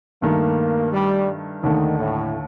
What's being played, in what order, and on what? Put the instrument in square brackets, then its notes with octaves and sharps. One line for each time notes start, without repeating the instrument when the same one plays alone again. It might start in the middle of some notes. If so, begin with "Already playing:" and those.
[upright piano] G2 D#3 A3 [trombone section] A#3
[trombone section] G3
[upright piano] D#2 D3 A3 [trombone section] D#3
[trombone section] A2